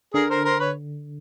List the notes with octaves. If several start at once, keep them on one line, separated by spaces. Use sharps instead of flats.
D3 G#4 A#4
A#4 C5
A#4 C5
B4 C#5